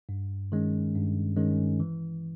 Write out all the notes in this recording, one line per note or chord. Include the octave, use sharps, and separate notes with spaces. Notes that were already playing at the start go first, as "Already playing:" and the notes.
G2
D#3 G#3 C#4
G2
D#3 G#3 C#4
E3